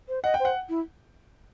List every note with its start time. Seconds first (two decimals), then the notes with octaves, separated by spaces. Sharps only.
0.09 C5
0.24 D#5 F#5
0.34 G5
0.40 C5
0.45 F#5
0.69 E4